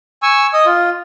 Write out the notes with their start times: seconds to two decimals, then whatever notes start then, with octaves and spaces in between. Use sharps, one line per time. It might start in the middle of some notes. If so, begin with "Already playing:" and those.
0.23 G#5 C#6 E6
0.54 D#5 D#6
0.66 F4